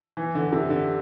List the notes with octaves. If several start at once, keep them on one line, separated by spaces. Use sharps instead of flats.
E3
D3
C3
D3